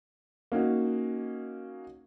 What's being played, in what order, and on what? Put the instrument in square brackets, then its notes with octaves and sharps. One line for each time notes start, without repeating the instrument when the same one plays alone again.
[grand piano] A#3 C#4 D#4 F#4